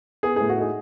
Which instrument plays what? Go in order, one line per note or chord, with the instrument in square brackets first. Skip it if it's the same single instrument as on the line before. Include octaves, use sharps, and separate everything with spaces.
[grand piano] B3 G#4
A2 G#4
F#4
D#4 G#4